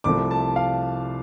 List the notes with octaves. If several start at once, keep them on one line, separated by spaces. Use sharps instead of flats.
C2 C3 F3 A3 D6
A5
F5